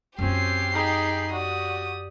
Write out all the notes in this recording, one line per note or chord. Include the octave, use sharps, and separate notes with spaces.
F#2 C4 C#4 F4 G4 C7
D#4 G#4 G5 B5
F#4 G4 D5 D#6